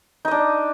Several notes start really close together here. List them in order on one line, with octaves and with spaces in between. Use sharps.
D#4 D#5 D4